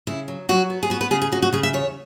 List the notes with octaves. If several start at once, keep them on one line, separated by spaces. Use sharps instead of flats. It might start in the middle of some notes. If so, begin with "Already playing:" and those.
C#3 E4
F#3
F#3 F#4
B3
G#4
B3 F#4
B4
C#3 G#4
G#4
C#3 F#4
F#4
C#3 G#4
E5
E2 C#5